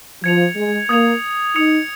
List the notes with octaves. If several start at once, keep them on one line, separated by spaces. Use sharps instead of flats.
F3 G#6 C#7 F7
G#3
A#3 D#6 G#6 F7
D#4 D#6 C#7 F7